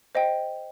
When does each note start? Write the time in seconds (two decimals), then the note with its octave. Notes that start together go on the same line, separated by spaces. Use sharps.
0.15 C5 D#5 G5